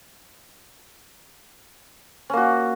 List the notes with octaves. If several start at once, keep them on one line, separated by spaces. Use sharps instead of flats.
A#3 C#4 F#4